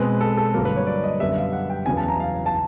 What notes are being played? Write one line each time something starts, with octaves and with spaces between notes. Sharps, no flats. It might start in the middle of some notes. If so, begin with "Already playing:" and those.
Already playing: B2 G#3 C4 B4
A4
A4
G2 D3 F#3 A#3 A#4
B4
C#5
D5
D#5
F#2 D3 G3 B3 E5
F5
F#5
G5
E2 C#3 F#3 B3 G#5
A5
A#5
F5
A5